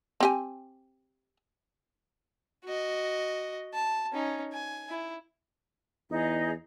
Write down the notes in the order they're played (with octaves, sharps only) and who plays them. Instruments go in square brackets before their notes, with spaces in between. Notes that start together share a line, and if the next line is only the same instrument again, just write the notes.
[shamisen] C4 G4 G#5
[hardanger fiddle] F#4 D#5
A5
C#4 D#4
G#5
E4
[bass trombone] E2 [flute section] D#4 G#4 D#5